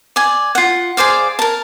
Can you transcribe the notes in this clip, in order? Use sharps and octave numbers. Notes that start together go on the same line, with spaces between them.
D5 G#5
F4 F#5
G#4 C5 D5 F5
A#4 A5